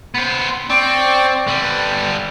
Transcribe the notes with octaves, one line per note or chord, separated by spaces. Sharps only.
B3 C5
C4 D5 G5 C#6
D3 G3
B4